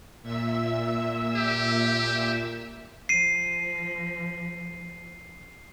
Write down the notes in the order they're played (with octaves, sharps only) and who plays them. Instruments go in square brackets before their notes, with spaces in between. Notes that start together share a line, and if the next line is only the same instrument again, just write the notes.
[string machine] A#2 E5 E6
[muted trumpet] G4
[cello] F3 [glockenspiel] C7 D#7